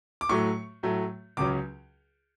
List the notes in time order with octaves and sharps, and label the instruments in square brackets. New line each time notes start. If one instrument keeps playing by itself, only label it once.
[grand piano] D6
A2 F#3 A3 C#6
A2 F#3 A3
C#2 C#3 F#3 C#4 D6